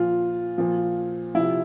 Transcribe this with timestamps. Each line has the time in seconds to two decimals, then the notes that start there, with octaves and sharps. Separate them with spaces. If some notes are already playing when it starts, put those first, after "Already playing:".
Already playing: A#2 F3 F4
0.58 A#2 F3
1.35 C3 F3 E4